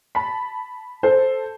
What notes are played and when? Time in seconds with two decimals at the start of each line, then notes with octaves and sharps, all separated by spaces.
0.15 A5 B5
1.03 A4 C5